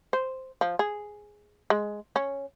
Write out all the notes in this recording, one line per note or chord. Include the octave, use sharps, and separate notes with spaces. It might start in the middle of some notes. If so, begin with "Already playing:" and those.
C5
F3
G#4
G#3
C#4